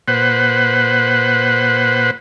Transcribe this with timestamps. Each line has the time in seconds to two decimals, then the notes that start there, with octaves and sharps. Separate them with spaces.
0.08 A#2 B4 C5 F#5